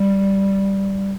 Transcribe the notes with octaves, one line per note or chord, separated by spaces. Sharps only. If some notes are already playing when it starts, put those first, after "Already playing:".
Already playing: G3